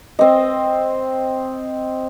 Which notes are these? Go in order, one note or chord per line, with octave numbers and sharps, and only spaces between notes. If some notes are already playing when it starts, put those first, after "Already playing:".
C4 D#5